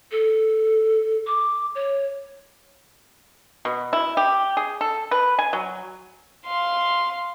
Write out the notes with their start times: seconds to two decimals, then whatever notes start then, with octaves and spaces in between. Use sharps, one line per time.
0.12 A4
1.27 D6
1.75 C#5
3.65 B2
3.93 E4
4.17 G4
4.57 G#4
4.81 A4
5.11 B4
5.39 G#5
5.53 F#3
6.47 F5 C6